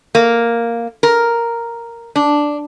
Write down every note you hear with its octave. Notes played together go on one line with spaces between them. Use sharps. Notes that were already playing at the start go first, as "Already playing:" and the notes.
A#3
A#4
D4